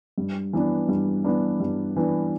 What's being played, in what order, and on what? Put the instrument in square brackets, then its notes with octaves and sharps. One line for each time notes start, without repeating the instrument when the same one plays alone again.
[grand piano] G2
E3 B3 D4
G2
E3 B3 D4
G2
E3 B3 D4